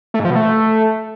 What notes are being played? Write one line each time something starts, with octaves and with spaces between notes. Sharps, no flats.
A3
G#2
F3
B2
A3